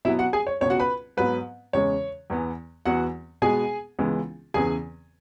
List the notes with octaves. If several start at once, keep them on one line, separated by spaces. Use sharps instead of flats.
B2 F#3 B3 E4 E5
F#4 F#5
G#4 G#5
C#5
C#2 B2 B3 C#5
F#4 F#5
B4 B5
G#2 F#3 B3 B4
E2 C#3 G#3 C#5
E2 E3 B3
E2 E3 B3 F#4 F#5
B2 G#3 B3 G#4 G#5
C#2 C#3 E3 G#3 B3
E2 C#3 E3 B3 G#4 G#5